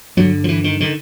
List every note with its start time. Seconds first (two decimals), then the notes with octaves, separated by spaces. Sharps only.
0.17 G2 D3 F#3
0.44 F3
0.49 E3
0.64 D#3
0.80 D3 D#3